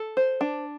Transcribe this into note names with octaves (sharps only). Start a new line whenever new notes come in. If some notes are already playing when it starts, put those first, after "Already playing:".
Already playing: A4
C5
D4